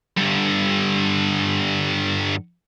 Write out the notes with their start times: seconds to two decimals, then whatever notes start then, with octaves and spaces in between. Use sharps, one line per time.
0.17 G2 D3